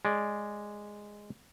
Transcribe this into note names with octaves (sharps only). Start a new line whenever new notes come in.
G#3 D5